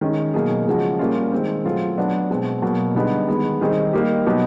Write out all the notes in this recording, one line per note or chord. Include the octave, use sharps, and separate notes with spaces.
D#3 G#3 C#4
B2 F#3 A#3 D#4 G#4
C#3 F3 G#3 C#4 F#4
A#2 G3 A#3 C#4 F4
D#3 G#3 C4
F#3 A3 C4 F4 G#4
F#3 B3 D4 F#4
B2 G#3 C4
B2 F#3 A#3
D3 G3 B3 D#4 G#4
D#3 G#3 B3
D#3 G3 C4 D#4 G#4
G3 A#3 D#4 G4
B2 F#3 B3 D#4 G4